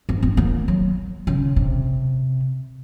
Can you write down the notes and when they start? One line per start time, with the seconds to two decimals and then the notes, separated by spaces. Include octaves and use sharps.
0.09 C4
0.22 C4
0.37 A#3
0.68 F#3
1.27 C#3
1.56 C3